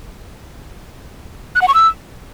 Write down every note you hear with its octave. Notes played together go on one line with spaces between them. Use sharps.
F#6
F#5
C#6
E6